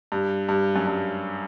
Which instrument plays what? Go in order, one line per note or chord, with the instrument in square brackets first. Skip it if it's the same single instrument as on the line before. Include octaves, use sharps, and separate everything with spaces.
[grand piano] G2
G2
F#2
G2